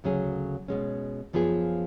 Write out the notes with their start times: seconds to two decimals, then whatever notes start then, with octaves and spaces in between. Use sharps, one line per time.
0.04 D2 C#3 F#3 C#4 G#4
0.68 B2 G#3 C#4
1.33 F#2 F3 B3 F4 G#4